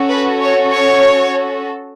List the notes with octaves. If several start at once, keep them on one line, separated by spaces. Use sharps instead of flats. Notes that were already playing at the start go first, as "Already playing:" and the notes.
Already playing: C#4 F#4 A4
B4
C#5
C#5